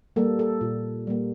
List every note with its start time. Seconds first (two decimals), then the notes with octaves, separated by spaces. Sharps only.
0.16 G3 A#3 A4
0.39 A4
0.61 A#2
1.07 G3 A#3